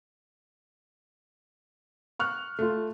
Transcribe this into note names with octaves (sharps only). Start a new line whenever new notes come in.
C#6 F6 F#6
A3 F4